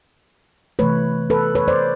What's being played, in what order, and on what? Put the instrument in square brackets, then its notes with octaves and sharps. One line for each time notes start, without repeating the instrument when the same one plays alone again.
[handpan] C3 E3 A3 B4 C#5
A4 B4
B4 C#5
C5 D5